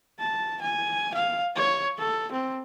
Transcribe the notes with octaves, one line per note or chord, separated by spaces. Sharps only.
A5
G#5
F5
C#5
A4
C4